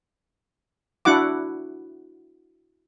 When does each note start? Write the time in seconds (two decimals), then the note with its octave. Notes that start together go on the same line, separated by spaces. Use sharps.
1.05 D4 E4 F#4 F#5 D6